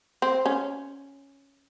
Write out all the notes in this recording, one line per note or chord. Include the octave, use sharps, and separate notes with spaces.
C4
C#4